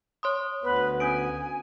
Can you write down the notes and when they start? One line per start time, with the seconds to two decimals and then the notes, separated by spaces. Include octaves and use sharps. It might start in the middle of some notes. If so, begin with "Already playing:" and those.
0.23 C#5 C6 D#6
0.63 D2 B3 B4
1.00 C#4 G#5 D#6 D7